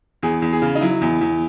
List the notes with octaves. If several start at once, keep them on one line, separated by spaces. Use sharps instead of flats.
E2 G#4
E2
G#4
C#3
D#4
F#3 E4
E2
E2